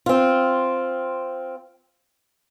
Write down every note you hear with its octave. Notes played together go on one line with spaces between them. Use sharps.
C4 F4